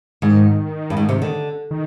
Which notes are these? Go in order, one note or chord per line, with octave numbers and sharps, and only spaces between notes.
G#2 D#3
G2
G#2
C3
D3
D#3